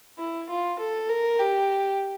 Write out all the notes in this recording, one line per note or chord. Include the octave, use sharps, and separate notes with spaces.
E4
F4
A4
A#4
G4